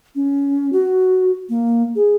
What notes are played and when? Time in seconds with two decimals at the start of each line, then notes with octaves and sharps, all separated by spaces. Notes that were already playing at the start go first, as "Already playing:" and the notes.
0.15 C#4
0.73 F#4
1.49 A#3
1.96 G#4